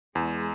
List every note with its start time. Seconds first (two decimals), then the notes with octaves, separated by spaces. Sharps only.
0.15 E2 G#3